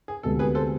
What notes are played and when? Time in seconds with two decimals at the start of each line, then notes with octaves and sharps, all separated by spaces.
0.08 G#4
0.23 D2 C3 G#3 B3 A4
0.39 G#4 B4
0.55 A4 C5